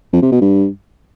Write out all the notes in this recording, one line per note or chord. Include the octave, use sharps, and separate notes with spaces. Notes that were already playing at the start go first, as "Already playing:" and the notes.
F2
C3
B2
G2